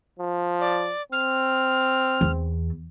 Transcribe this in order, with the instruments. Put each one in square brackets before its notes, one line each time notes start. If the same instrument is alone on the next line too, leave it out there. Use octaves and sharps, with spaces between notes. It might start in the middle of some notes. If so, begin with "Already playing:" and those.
[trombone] F3
[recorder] D5
[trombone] C4 [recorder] F6
[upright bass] E2